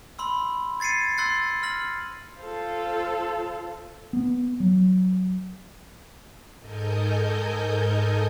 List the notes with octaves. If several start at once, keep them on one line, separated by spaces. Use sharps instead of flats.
B5 C6 E6
G#6 A6 C7 C#7 D#7
C6 E6 F#6 A6 C7
F6 A#6 F#7
F4 A4 C5 F5
B3
F#3
G#2 A4 A#4 D#5 G#5 G6